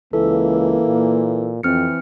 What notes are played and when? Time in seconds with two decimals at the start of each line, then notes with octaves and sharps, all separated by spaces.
0.13 C#2 E3 A#3 A4
0.86 A#2
1.63 F2 E3 C4 F6 C#7